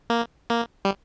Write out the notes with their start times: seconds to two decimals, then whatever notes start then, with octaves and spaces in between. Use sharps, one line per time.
0.10 A#3
0.50 A#3
0.85 G3